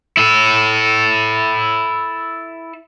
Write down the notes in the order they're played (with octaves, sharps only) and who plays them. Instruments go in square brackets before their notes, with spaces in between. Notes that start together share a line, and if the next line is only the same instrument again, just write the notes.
[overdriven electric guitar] E4 A4